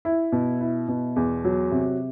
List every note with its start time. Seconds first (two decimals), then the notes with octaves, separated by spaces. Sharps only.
0.05 E4
0.32 B2
0.61 E4
0.88 B2
1.16 E2
1.44 F#3
1.72 C3